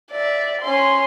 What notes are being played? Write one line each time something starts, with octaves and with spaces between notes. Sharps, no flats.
D5 E5
C#4 C6